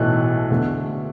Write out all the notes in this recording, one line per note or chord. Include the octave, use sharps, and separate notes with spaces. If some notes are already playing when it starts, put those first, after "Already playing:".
Already playing: B1 A2 E3 A3 F#6
E2 D3 A3